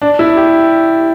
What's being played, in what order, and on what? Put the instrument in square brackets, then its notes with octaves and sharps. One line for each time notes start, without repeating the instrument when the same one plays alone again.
[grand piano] D4
E4
G4